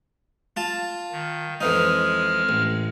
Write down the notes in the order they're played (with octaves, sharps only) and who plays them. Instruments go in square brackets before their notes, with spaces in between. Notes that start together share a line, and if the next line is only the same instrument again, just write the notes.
[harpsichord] F4 A5
[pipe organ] D#3
[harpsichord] F2 E3 D#4 [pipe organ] G#3 F6
[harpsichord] A1